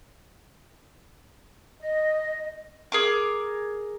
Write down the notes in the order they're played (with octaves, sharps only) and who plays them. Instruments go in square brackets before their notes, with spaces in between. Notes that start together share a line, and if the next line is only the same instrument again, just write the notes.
[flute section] D#5
[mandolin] G#4 A#4 D6